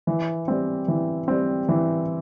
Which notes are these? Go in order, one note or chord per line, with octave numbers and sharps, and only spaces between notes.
E3
G3 C4
E3
G3 C4
E3